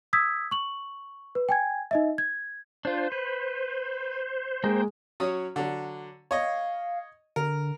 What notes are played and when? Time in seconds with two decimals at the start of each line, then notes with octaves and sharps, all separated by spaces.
0.13 D#6 E6 G#6 B6
0.51 C#6 F#7
1.35 B4
1.49 G5 G#5 G#6
1.91 D#4 D#5 E5
2.18 G#6
2.85 D4 F4 C5
3.12 B4
4.64 G#3 A#3 A#4 G5
5.20 F#3 C#4 D#6
5.56 D3 F#3
6.31 C#5 D#5 F5
7.36 D3 A#4